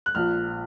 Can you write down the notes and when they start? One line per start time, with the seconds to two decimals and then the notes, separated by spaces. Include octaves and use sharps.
0.06 F#6
0.15 A#1 A#2 F3 F6